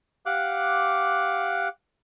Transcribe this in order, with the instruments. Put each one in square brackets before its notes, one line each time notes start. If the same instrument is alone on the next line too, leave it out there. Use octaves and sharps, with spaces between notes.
[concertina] G4 F5 F#5 D6 F#6